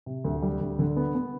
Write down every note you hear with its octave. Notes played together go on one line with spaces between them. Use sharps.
C3
D2
G3
D2
D3
B3
B3